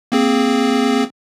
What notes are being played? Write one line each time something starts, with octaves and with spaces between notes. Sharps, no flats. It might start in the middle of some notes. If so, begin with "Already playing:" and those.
A#3 C4 G#4